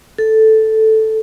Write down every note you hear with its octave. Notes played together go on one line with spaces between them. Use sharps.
A4